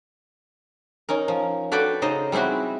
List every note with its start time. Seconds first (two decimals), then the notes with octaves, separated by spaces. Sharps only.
1.09 C#4 D#4 A#4
1.28 F3
1.72 F#4 A4 B4 D5 G5
2.02 C#3 D#4 C5 D#5
2.32 G3 G#3 C4 E4 F#4